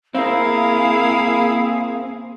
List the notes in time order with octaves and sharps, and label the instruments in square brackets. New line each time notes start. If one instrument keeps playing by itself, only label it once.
[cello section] A#3 G#4 [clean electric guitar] C4 A#4 [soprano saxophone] E4 [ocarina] F5